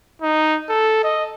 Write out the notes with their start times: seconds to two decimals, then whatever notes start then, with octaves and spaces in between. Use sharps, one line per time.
0.22 D#4
0.69 A4
1.04 D#5